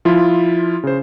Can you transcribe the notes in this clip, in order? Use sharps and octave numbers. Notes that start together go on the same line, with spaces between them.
F3 E4 F4
C#3 C5